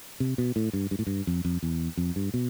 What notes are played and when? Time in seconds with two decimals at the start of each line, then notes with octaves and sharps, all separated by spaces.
0.20 C3
0.38 B2
0.56 A2
0.73 G2
0.91 G2
0.99 A2
1.07 G2
1.27 F2
1.45 F2
1.63 E2
1.97 F2
2.16 G2
2.34 B2